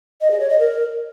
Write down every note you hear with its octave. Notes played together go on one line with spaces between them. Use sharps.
D#5
G#4
C#5
D#5
A#4